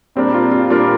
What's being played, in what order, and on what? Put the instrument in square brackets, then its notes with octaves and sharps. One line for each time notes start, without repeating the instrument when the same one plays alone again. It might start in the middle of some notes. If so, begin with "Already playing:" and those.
[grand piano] A#2 G3 D4 A#4 [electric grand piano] C4
[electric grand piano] F4
F4
[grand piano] A#2 G3 D4 A#4 [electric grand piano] F4